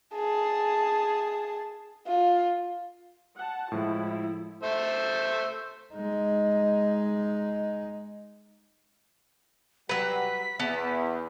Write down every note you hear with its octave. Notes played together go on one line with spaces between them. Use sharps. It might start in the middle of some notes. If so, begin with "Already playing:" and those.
G#4 A5
F4
F#5 A5
A2 F3 G#3 E4
A3 C5 E5
G#3 D#4
F#3 G3 F#4 B4 B6
E2 E3 B3 A5